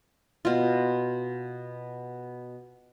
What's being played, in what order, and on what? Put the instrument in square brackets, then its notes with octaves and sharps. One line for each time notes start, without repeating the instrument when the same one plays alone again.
[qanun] B2 F4